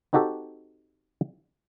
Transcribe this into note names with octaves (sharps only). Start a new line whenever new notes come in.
C4 D#4 F#4 G4 A4